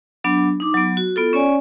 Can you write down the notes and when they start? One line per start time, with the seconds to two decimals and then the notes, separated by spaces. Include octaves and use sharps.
0.24 F#3 B3 D4
0.60 D#4 D6
0.74 F#3 B3
0.97 F#4
1.16 B3 F4 A4
1.33 C#4 C#5 D5 G#5